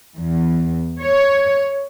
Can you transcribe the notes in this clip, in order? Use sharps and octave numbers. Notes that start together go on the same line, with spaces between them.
E2
C#5